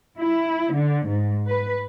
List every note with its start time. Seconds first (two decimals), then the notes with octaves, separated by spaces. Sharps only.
0.19 E4
0.74 D3
1.06 G#2
1.47 B4